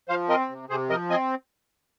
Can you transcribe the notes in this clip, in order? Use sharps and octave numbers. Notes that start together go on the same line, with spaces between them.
F3 C5 F5
C4 A#4 D#5
C3
C3 G#4 C5
F3 A#4 D#5
C4 D#5 G#5